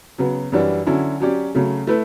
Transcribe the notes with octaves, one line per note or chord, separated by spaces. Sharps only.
C#3 F#3 B3
F#2 E3 G3 D4 F#4
D3 F#3 C#4 E4
F#3 C#4 G4 D5
C#3 F#3 A3
A3 E4 B4